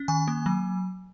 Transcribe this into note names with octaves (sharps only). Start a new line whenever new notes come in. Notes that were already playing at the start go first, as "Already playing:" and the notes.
Already playing: C#4
D#3 G#5
A#3
F#3